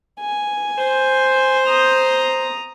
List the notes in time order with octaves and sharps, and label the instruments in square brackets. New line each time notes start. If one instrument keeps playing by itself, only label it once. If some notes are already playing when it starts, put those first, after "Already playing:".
[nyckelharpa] G#5
[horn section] C5
[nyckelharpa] A#5 D#6